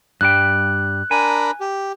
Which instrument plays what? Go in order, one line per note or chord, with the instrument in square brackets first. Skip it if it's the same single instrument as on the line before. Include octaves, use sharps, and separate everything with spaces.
[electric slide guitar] G2 G3 G5 [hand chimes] F#6
[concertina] D4 A#4 B5 [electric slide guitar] G#5
[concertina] G4